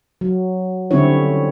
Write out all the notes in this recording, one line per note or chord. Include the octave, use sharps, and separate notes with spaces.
F#3
D3 G3 C4 C#4 E4 C#5